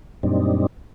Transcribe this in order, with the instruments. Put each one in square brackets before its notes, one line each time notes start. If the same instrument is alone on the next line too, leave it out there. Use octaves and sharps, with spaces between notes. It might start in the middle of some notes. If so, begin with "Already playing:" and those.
[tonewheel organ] F#2 A#2 G3 C4 D4 D#4